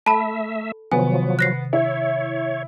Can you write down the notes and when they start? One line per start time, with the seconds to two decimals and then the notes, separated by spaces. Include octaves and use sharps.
0.06 A3 A4 E5 A5 B5
0.92 C3 D#3 F3 F#3 B3 G#5
1.39 F#6 A#6 C7
1.73 E4 C#5